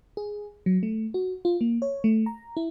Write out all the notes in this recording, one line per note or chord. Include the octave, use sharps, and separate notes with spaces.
G#4
F#3
A3
F#4
F4
A#3
C#5
A3
A#5
E4